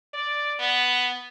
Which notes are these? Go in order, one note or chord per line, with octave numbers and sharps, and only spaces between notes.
D5
B3